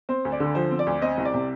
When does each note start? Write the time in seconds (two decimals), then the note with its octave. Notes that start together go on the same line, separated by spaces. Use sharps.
0.09 C4 C5
0.25 D2
0.32 D5
0.40 D3
0.55 F3 C5
0.71 C4
0.79 D5
0.87 D2
1.02 C4 D#5
1.18 C2
1.25 D5
1.34 C3